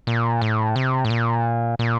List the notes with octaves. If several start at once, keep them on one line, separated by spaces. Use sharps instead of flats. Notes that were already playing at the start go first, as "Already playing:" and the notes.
A#2
A2
C3
A2
A#2
A#2